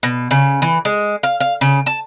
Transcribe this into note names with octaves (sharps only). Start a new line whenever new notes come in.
B2
C#3
E3
G#3
F5
F5
C#3
A5